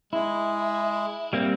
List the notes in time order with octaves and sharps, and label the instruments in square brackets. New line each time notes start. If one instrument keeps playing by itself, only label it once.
[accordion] G#3 [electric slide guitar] E4
[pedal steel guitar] G3 A#3 C4